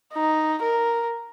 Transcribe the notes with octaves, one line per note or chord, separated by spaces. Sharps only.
D#4
A#4